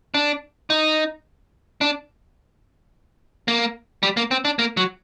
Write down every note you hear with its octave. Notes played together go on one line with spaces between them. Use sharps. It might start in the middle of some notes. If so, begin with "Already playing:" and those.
D4
D#4
D4
A#3
G3
A#3
C4
D4
A#3
F#3